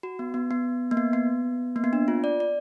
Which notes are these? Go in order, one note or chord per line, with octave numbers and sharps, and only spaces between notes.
F#4
B3
B3
B3
A#3
B3
B3
A#3
B3
D4
F4
D5
D5